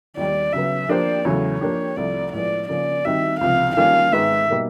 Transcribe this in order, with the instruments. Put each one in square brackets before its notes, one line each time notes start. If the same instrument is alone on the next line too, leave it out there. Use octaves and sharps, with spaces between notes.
[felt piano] D#2 D#3 G3 [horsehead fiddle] D5
[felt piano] C#3 F#3 B3 [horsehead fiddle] E5
[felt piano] F3 A#3 D4 G4 C5 [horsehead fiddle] D5
[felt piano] E2 C#3 F#3 A3 [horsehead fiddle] C#5
[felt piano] F3 A#3 D4 G4
[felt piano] C2 C3 F3 A3 [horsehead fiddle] D5
[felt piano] A2 F3 G#3 B3 [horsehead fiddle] D5
[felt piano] C#3 F3 A#3 C#4 [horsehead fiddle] D5
[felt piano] D#3 G3 C4 D#4 F#4 [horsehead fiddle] E5
[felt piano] C#2 C3 F3 [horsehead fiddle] F5
[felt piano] D#3 G3 A#3 C#4 F4 [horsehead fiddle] F5
[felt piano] G#2 D#3 G#3 B3 [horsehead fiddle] E5
[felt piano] B2 G3 A#3 D#4